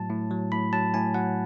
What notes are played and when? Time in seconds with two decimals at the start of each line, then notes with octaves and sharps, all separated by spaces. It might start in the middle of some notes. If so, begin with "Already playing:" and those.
Already playing: A2 F#3 A5
0.10 A2
0.31 F#3
0.52 A2 B5
0.73 F#3 A5
0.94 A2 G#5
1.14 F#3 F#5